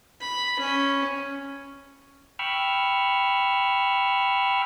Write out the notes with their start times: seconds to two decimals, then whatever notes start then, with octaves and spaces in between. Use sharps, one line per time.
0.21 B5
0.59 C#4
2.39 G5 B5 C#6 E6 F6